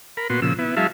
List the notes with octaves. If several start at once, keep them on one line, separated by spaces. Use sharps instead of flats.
A#4 B5
A#2 B3 F#4 C6
A#2 C#3 F3 E6
B3 E4
F#3 G#3 E4 E5 F5 A5